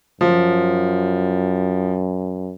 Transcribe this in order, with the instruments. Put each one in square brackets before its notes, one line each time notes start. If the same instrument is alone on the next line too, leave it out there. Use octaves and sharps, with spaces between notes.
[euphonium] F#2 [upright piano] F3